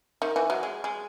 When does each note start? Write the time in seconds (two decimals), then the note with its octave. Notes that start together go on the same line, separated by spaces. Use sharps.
0.22 D#3
0.36 E3
0.50 F#3
0.63 G#3
0.84 G#3